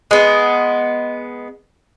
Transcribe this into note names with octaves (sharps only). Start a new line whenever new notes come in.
G#3 B3